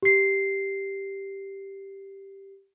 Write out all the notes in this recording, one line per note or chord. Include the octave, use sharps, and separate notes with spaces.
G4 C7